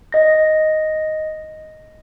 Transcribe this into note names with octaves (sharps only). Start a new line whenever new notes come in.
D#5 A#6